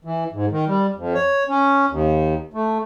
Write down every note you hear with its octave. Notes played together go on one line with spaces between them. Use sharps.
E3
G#2
D#3
G3
F2
C#5
C#4
D#2
A3